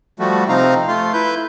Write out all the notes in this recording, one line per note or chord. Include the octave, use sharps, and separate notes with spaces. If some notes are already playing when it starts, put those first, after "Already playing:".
F3 G3 A3 F#4
C3 F3 C4 D#4 F5 A#5
A3 F4 C6
E4 B4 G6